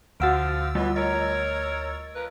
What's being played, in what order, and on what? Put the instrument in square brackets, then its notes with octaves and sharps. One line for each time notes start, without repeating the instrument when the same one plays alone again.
[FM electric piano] D2 E6 A6 [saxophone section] F3 F5 [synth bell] F#4 F#5 D7
[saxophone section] E3 B3 [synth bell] G3 A3 F4
[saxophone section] A#4 C#5 [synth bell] D#5
[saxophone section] F3 A#4 B4